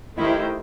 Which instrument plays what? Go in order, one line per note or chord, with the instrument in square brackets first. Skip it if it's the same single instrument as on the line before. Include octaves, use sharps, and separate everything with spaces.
[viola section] D#3 A3 D#4 G4 C5 [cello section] E4